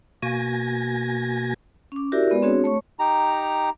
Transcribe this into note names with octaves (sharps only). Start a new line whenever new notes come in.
B2 A#3 F#4 G#5 G#6 A#6
C#4 D6
E4 F#4 G4 A#4 D5 E5
G#3 B3 B4 D5
C4 D4 F#4 G#4 C#5
A3 C#5 C#6
D#4 G4 A#5